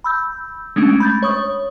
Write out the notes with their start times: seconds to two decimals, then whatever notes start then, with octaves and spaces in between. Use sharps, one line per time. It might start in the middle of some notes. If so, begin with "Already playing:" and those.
0.04 B5 E6 G6
0.76 G#3 A3 C#4 D4
1.00 B5 G6 A6
1.23 C#5 C#6 D#6